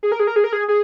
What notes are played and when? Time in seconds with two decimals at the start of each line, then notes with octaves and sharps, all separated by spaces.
0.03 G#4
0.12 A#4
0.20 G#4
0.27 A#4
0.36 G#4
0.44 A#4
0.53 G#4
0.68 G#4